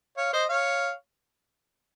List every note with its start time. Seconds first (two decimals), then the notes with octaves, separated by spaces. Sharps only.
0.17 C#5 F5
0.33 C5 D#5
0.49 C#5 F5